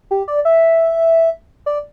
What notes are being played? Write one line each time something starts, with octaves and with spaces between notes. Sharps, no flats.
G4
D5
E5
D5